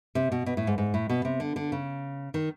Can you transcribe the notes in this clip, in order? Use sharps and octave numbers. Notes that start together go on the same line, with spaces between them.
C3
B2
B2
A2
G#2
G#2
A2
B2
C3
D3
D3
C#3
D#3